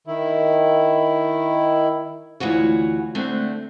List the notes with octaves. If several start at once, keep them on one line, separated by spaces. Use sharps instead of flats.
D#3 E4
D2 E3 F4 F#4 C#5
D3 A3 C4 D4